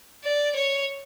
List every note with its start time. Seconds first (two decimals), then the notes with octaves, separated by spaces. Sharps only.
0.23 D5
0.55 C#5